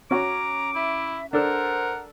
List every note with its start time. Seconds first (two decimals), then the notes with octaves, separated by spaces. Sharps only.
0.11 C#4 F#4 A#5 D6
0.75 E4 E5
1.33 D4 A4 A#4 C5 F#5